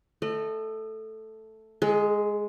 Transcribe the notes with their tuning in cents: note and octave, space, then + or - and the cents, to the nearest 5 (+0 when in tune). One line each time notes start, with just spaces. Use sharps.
A3 +0 D#5 -30
G#3 +0 A4 -45